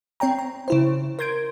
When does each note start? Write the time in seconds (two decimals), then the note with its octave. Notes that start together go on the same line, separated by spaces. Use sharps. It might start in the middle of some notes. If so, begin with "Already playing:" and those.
0.20 C4 C#5 G5 A#5
0.39 A#5
0.68 C#3 E4 C5
1.19 A#4 C6 G6 G#6 D7